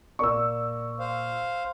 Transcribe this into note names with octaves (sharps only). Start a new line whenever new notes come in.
A#2 A#4 D5 C#6 E6
C5 F5